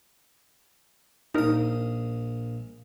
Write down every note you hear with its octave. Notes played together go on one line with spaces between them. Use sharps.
A#1 D#4 A#4 D#6